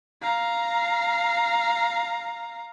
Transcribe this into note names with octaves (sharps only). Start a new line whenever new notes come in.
F5 A#5